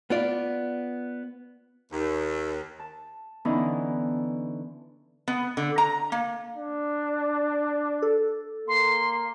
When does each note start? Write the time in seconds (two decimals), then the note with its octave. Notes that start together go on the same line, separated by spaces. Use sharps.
0.10 B3 F4 D5
1.92 D#2
2.79 A5
3.45 D3 E3 B3 C#4 D#4 E4
5.28 B3
5.57 D3
5.78 A#5
6.12 A#3
6.57 D4
8.02 A4
8.68 A#3 C6